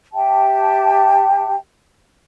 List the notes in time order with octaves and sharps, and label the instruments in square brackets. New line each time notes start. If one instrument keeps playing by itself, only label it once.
[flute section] G4 E5 G5 A5